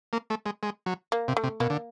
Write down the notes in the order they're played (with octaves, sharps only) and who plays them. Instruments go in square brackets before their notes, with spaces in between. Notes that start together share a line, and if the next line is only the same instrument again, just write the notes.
[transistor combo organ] A#3
A3
G#3
G#3
F#3
[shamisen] A#3
[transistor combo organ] C3
[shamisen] A3
[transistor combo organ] C3
[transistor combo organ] B2 [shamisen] A#3
[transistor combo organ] D3